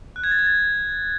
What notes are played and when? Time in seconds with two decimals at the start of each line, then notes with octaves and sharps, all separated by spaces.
0.16 F#6
0.24 G#6
0.31 A6
0.39 G#6
0.47 A6